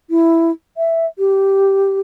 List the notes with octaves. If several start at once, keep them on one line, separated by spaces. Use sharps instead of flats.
E4
E5
G4